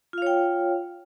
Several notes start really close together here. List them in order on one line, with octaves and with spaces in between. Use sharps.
F4 F5 C#5 G5